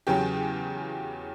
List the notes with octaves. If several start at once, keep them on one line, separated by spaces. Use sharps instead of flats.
E2 C#3 F#3 G4